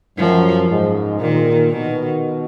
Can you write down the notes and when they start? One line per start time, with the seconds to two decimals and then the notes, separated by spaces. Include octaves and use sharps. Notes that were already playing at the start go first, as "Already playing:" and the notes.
0.18 F#2 F3
0.69 G#2
1.20 A#2 D#3
1.71 B2 D#3